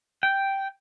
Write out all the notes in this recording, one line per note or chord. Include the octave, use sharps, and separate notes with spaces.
G5